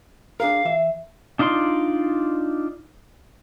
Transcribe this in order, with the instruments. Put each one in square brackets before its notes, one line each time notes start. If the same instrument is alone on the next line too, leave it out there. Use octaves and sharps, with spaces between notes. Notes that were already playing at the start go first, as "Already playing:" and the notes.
[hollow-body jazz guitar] D4 G#4 A#4 [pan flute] F5
[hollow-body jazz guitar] E3 E5
[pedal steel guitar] D4 D#4 F4 D5 C6